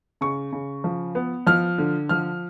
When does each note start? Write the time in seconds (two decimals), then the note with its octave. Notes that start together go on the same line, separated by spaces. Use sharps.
0.21 C#3 C#6
0.52 C#3
0.84 F3
1.15 B3
1.47 F3 F6
1.78 D3
2.09 F3 F6